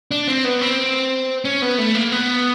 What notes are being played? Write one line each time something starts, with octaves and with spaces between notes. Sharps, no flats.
D4
C4
B3
C4
C#4
B3
A3
A#3
B3